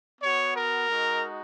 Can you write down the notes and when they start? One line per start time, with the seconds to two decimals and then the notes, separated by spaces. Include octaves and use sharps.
0.22 B3 F#4 C#5
0.55 A#4
0.89 G#3 D#4 F#4